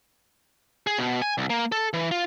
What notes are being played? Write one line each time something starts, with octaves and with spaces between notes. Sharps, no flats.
G#4
B2
G#5
C2
A#3
A4
E3
F4